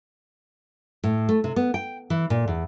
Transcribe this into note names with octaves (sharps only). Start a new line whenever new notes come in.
A2
A3
C3
B3
G5
E3
A#2
E2